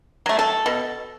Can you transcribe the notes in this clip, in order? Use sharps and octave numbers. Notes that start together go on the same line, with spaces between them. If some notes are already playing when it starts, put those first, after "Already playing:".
F#3 A3
A4
B2